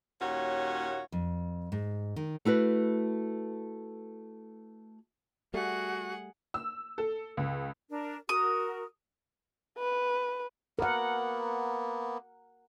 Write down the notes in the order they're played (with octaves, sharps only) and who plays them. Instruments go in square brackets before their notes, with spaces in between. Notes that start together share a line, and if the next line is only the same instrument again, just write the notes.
[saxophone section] D#2 A#2 C#4 F#4 C#5
[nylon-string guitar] F2
G#2
D#3
A3 E4 F#4 B4
[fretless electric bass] G3 A3 [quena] F#4 [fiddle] G#4 F#5
[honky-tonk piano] E6
A4
C#2
[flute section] D4 A#4
[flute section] F#4 A#4 [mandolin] D#6
[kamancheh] B4
[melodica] A#3 B3 [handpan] A#4 F#5